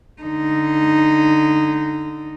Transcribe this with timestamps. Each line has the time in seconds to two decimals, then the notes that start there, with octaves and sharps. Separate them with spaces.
0.22 D3 D#4